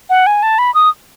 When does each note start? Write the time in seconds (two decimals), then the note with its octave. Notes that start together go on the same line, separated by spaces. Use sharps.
0.10 F#5
0.27 G#5
0.43 A5
0.59 B5
0.74 D#6